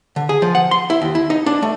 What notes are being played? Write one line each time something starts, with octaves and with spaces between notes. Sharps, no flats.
D3
G#4
F3
F#5
C6
E4
D#2
E4
D#4
D4
A3